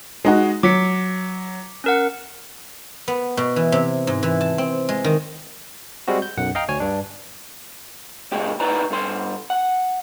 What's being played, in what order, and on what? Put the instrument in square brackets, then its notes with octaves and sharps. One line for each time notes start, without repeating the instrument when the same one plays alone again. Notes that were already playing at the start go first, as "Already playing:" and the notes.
[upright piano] G#3 D#4 F#4
[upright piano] F#3 [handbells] D6 B6 C#7
[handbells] C#4 A#4 F#5
[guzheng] B3
B2
E3
C3
G#2
E3
A5
C4
G#3
D#3
[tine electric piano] G3 G#3 C4 F#4
G6
B1 F#2 F#5
D#5 F5 G5 A#5
D2 C#5 G#5
G2 D4
[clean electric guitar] C#2 A#2 G#3 G4
D#4 E4 B4 D5 G#5 A#5
G2 A4 C6
F#5